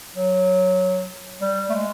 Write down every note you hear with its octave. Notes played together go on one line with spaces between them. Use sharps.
F#3
G3
A3
G#3